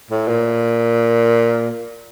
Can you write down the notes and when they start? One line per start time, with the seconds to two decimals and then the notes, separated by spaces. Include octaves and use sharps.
0.10 A2
0.28 A#2